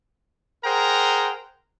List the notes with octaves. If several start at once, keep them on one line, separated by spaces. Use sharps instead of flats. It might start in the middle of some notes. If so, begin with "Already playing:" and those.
G#4 A#4 C5 F#5 G5 A#5